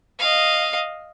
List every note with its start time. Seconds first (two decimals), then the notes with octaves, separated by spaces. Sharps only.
0.19 D#5 F5